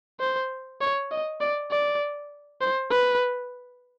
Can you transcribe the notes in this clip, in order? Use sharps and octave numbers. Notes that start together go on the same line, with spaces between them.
C5
C#5
D#5
D5
D5
C5
B4